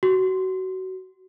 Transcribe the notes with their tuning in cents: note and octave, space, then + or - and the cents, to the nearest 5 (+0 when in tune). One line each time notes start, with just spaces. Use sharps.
F#4 +25